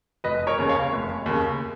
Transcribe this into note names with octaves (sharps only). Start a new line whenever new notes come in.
F1 B4 D#5
A#4 C#5
D#2 C#3
C#5 F5
F1
D#2 C#3